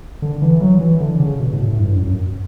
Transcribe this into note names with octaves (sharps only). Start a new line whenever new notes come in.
D3
E3
F#3
E3
D3
C#3
B2
A2
A2
G2
F#2
F#2